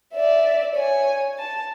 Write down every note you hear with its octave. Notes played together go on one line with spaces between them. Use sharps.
D5 E5
C#5 G#5
A5